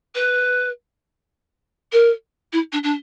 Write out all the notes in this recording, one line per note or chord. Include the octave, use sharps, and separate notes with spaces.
B4
A#4
E4
D4
D4